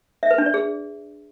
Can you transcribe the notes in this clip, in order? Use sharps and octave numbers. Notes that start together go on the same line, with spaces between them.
E5
B4
D4
D5
G#4